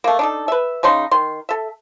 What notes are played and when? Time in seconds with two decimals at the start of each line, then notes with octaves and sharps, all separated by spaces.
0.04 A3 A#3
0.19 D4 D#4 A4
0.48 B4 E5
0.83 C#3 C#4 D#4 C6
1.11 D#3 C6
1.49 A4 E5